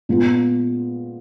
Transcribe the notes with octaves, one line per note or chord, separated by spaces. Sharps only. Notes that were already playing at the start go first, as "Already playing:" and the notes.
A#2 G#3 B3 F4